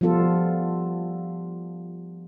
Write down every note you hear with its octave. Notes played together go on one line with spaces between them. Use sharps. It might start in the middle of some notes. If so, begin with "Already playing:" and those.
F3 G3 B3 F4 A4